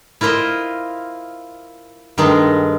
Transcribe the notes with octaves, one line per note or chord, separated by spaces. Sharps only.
E4 F4 A#4 C5 D#5
G2 D#3 G#3 A3 D#4 C6